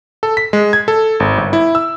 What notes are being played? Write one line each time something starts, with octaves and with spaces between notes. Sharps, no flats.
A4
B6
G#3
G#6
A4
G#1
G1
E4
E6